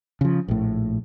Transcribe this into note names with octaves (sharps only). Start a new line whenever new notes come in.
C#3 F3
A#1 A2